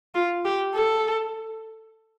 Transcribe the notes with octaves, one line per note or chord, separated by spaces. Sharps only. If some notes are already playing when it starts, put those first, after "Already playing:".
F4
G4
A4